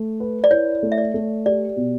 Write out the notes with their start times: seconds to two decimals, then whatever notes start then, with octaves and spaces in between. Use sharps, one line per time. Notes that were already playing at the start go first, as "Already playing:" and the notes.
Already playing: A3
0.20 B4
0.44 D5
0.51 E4 C#5
0.83 A3
0.92 E5
0.98 D5
1.14 A3
1.46 G4 D5
1.76 B2